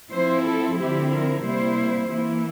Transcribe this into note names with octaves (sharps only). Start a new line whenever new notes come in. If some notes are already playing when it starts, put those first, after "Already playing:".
F3 C4 E4 C5
A4
D3 F3 C4 E4 G4
A#4
C3 G3 A#3 E4 C5
E3 A#3 E4